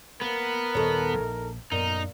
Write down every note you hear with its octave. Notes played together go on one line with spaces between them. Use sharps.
A#3 B3 A#4
D#1 D#4 A4 C#5
A#1
F#2 A#2 B3 D#4 A#4